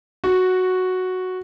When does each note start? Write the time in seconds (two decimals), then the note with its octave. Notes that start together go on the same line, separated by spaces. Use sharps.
0.24 F#4